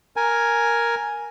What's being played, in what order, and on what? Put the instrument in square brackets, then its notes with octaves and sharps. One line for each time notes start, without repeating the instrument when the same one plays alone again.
[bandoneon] A#4 G#5